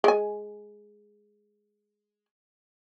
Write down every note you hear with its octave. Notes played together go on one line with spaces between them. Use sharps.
G#3 G#5